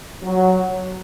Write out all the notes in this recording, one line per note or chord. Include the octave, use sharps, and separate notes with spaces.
F#3